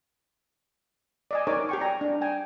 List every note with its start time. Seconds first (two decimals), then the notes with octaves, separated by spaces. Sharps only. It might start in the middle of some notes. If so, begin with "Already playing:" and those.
1.31 D5 D#5 G#5
1.47 D#4 A#4 C#5 D5 G#5 D6
1.69 G4 G5 C#6
1.81 D5 G#5 A#5
2.01 D4
2.21 G5 G#5